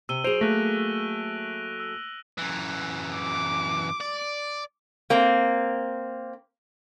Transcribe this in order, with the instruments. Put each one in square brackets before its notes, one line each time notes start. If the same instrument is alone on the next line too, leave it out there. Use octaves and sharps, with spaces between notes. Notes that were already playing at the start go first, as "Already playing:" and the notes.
[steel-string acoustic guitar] C3 [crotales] E6 D#7 G7
[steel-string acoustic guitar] F#3 G#4 [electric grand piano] C5 [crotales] D7 F7
[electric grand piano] A3 A#3 [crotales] F#6 A#6
[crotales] E6
[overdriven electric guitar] F#2 E3
[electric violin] D6
[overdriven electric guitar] D5
[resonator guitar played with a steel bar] A#3 C4